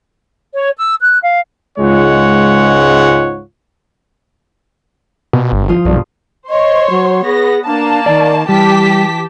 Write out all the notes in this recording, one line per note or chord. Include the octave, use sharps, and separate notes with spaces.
C#5
E6
F#6
F5
C#2 G#2 G#3 F4 C#5 F#5
B2
G1
F3 F4 D#6
B1 G2
C5 C#5 D#5 C6
F#3
B3 G#4 A#6
A#3 D4 A5
D#3 D5
E3 G3 G4 A5 B6